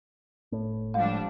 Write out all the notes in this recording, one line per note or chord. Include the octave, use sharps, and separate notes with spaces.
F1 A2
F3 G3 G#3 D4 F5